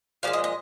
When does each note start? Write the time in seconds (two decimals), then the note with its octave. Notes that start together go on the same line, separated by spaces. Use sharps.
0.23 A#2 F3 G#3 F5
0.33 D#5
0.44 D#5